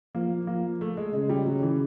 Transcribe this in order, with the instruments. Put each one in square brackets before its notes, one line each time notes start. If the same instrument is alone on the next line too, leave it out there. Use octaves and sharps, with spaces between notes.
[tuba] F3 [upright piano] A#3
[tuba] F3 [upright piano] A#3
[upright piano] A3
G#3
[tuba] C#3 [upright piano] G#3
[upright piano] G3
F#3
E3